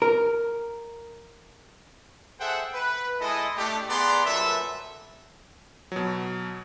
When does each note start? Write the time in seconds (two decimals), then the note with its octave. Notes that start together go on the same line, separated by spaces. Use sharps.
0.02 A#4
2.40 G#4 A4 C5 E5 F#5 G5
2.74 B4
3.21 G#3 E4 A4 D#5
3.57 A3 D4 G4
3.90 B3 G#4 D5 A#5 C6
4.25 F#2 A#2 A4 B4 E5
5.92 B2 F#3